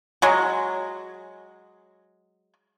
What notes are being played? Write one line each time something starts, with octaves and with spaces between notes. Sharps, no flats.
F#3 G#3